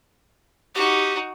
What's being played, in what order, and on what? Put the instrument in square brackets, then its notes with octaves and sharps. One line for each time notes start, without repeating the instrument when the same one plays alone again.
[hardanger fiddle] D#4 F#4 [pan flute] G4